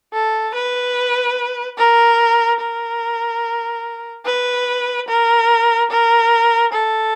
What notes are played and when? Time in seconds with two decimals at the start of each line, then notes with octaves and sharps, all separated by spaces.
0.14 A4
0.55 B4
1.78 A#4
2.61 A#4
4.26 B4
5.08 A#4
5.91 A#4
6.73 A4